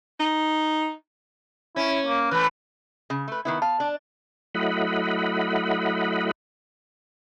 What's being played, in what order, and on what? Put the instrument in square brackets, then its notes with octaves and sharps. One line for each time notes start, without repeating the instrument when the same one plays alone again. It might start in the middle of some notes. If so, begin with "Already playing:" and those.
[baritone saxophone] D#4
[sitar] C#4 [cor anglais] E4
[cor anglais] A#3
[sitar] E3 A3 [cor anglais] B4
[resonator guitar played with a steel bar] C#3
A3 B4
D#3 B3 E4
[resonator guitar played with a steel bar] F5 [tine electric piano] A5
[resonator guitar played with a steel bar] D4 D5
[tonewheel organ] F#3 A3 E4 D#5 F#5 B5